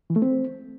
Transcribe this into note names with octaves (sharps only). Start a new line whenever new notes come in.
E3
A3
C4